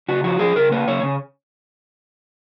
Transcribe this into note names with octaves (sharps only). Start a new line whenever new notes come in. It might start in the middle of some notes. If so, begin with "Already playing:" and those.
C#3 F#4
F3 F#4
F3 G#4
C#3 A#4
A#3 B4
C#3 C#5
C#3